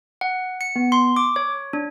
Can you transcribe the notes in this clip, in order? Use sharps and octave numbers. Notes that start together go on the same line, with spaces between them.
F#5
C#7
B3
C6
D6
C#5
D4